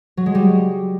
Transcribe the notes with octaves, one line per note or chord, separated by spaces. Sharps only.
F#3
G#3
G3